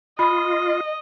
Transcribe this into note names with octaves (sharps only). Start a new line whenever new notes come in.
F4 D#5 B5